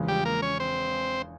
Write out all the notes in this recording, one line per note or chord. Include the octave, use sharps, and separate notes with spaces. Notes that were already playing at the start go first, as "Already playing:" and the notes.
Already playing: E1 E2 C#3 F3 G#3
G3 G4
A#3 A#4
C#4 C#5
C4 C5